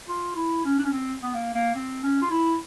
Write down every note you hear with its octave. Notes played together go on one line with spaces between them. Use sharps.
F4
E4
C#4
D4
C#4
C4
B3
A#3
A#3
C4
C#4
F4
E4